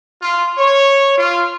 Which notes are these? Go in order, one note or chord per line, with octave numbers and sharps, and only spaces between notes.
F4
C#5
F4